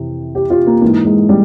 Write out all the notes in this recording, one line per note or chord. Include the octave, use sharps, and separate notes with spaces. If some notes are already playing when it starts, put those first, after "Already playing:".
Already playing: F2 C3 E3
G4
F4
A#3
G#2 E3 A#3
G#3
G3